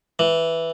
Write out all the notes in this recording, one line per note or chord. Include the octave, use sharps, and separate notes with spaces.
E3